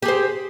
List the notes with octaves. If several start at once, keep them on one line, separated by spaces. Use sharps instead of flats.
G4 G#4 C5